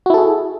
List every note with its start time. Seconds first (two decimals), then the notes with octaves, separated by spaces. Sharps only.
0.06 F#4
0.10 E4
0.14 A4
0.18 G#4